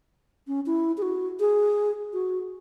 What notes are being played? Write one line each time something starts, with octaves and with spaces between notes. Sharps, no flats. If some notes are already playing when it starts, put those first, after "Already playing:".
C#4
E4
G#4
F#4
G#4
F#4